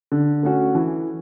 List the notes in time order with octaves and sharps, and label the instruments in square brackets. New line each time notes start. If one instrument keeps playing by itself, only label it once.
[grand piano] D3
A3 C#4 F#4
E3